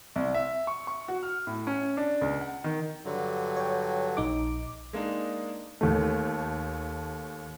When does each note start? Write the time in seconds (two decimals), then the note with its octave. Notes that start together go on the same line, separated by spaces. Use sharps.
0.16 C2
0.34 E5
0.67 C#6
0.87 C#6
1.08 F#4
1.23 F6
1.47 A2
1.67 C#4
1.97 D4
2.21 C#2
2.41 F#5
2.64 D#3
3.05 G2 D3 F#3
3.57 C#5 G5
4.17 A#1 D#4 D6
4.93 G#3 A#3 D4 D#4
5.81 D#2 A3